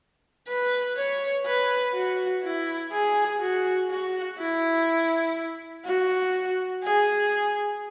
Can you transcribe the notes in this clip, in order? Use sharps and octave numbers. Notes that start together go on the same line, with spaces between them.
B4
C#5
B4
F#4
E4
G#4
F#4
F#4
E4
F#4
G#4